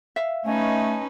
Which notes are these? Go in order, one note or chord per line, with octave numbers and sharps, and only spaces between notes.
E5 F5
A3 C#4 D#4 B4 D#5 G#5 A5